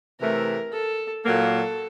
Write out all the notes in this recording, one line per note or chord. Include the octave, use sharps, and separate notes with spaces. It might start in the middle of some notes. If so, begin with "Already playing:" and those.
C3 E3 A3 A#4
A4
A#2 F#3 A#3 A4